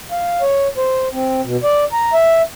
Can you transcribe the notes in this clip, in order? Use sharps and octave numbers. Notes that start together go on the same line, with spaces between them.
F5
C#5
C5
C4
B2
D5
A#5
E5